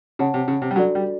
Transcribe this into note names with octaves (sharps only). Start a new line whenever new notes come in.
C#3 C#5 F#5 A5
C3
C#3
C3
G3
F#3 D4 F#4 A4 D5
G3